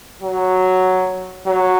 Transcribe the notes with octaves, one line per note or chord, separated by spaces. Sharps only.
F#3
F#3